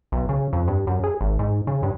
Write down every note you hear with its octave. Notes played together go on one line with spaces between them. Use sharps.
B1
C#3
F2
G2
F#2
G#4
G#1
G#2
C#3
G2